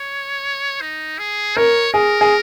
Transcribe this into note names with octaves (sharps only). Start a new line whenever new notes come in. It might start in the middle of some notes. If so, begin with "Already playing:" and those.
Already playing: C#5
D#4
G#4
A#4 C#5
G#4 A#4
G#4